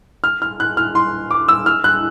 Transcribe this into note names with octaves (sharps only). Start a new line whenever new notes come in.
F6
F6
F#6
F6
C6
D6
E6
F6
F#6